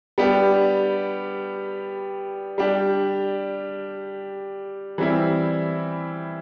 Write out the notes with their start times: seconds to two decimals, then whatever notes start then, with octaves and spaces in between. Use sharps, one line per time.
0.18 G3 B3 D4 G4
2.58 G3 D4 G4
4.98 E3 G3 C4 E4